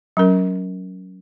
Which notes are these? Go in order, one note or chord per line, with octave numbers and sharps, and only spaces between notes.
F#3 C#4 A#4